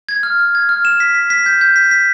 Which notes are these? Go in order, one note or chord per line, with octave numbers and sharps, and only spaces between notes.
G#6
F6
F6
G#6
F6
E7
B6
B6
B6
G6
G6
B6
B6